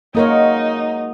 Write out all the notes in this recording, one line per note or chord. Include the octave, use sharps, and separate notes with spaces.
F#3 G#3 A#3 D#4 A#4 C#5 D#5